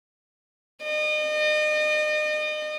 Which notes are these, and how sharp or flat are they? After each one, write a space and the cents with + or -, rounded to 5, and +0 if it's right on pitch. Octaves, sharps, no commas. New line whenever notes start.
D#5 -35